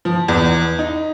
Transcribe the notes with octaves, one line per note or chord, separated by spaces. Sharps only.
F3
E2
D#4